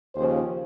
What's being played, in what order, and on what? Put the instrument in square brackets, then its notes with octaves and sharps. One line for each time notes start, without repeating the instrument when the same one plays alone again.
[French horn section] D#2 C#3 F3 C5